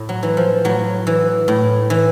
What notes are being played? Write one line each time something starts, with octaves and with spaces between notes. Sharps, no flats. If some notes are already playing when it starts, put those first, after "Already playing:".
Already playing: A2
F#3
E3
F3
A2 F#3
E3
A2
E3